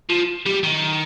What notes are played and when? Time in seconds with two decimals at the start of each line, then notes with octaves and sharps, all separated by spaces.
0.10 F3
0.46 G3
0.64 D#3